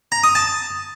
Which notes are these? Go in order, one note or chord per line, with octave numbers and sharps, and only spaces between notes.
A#5
D#6
A5